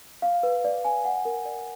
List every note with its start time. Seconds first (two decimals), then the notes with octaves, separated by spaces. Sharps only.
0.22 F5
0.43 B4
0.64 D5
0.85 G#5
1.05 F#5
1.25 A#4
1.45 D5